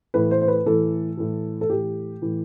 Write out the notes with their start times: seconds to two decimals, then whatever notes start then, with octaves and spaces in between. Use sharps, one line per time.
0.14 A2 E3 B4
0.31 C5
0.41 C5
0.48 B4
0.66 A2 E3 A4
1.17 A2 E3
1.61 A4
1.69 A2 E3 G4
2.22 A2 E3